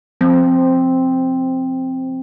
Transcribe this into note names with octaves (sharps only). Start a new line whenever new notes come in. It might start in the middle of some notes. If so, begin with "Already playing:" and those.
F3 C4